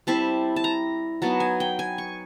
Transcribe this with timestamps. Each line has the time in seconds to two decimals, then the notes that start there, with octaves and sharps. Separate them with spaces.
0.07 G3 C4 E4 A5
0.56 A5
0.64 A#5
1.22 F#3 B3 D#4 A5
1.40 G#5
1.60 G5
1.79 G#5
1.98 C#6